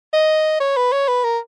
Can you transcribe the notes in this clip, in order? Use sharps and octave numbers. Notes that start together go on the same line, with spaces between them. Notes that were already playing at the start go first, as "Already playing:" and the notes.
D#5
C#5
B4
C#5
B4
A#4